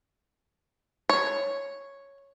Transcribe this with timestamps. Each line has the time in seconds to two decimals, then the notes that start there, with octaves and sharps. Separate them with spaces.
1.09 C#5